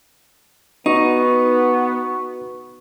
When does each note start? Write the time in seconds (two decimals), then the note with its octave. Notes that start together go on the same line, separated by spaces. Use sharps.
0.86 B3 D#4 F#4 B4 C#6